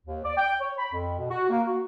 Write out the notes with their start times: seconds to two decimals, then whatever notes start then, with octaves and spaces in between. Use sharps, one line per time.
0.06 D#2
0.24 D5
0.37 G5
0.61 C#5
0.78 B5
0.92 F2
1.18 B2
1.29 F#4
1.50 A#3
1.67 F#4